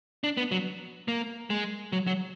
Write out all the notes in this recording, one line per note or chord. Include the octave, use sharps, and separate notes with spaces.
D4
B3
F#3
A#3
G#3
F#3
F#3